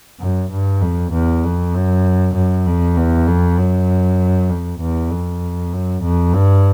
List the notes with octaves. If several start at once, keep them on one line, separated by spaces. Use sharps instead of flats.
F#2
G2
F2
E2
F2
F#2
F#2
F2
E2
F2
F#2
F2
E2
F2
F#2
F2
G2